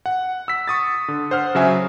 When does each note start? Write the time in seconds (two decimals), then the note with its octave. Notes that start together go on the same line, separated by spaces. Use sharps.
0.06 F#5
0.48 E6 B6
0.68 C#6 D#6 A6
1.08 D3
1.31 C5 F#5 F6
1.55 C#3 F#3 E5 G#5